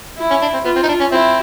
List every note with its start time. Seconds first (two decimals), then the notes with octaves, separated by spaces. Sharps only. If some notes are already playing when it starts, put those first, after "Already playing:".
0.18 E4
0.30 C#4
0.42 D4
0.54 C4
0.64 B3 F4
0.76 C4
0.83 D#4
0.88 D4
1.00 C#4
1.11 C4 E4